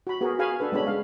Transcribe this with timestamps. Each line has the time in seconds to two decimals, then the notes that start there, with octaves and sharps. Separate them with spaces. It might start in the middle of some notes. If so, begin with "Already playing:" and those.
0.07 F#4 B5
0.21 B3 F#4 G#4 A#4
0.39 F#4 G#4 F5 G#5 B5
0.60 D4 A4 B4
0.72 G#3 B3 C#4 D4 B5
0.87 G#3 F5